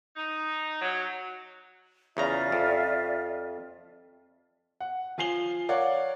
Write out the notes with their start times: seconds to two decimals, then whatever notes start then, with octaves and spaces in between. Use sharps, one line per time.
0.17 D#4
0.81 F#3
2.17 E2 C#3 F4 D5 E5 A#5
2.52 F2
4.80 F#5
5.18 F3 F4 G#5 C7 F7 G7
5.69 A#4 C#5 D5 F5 F#5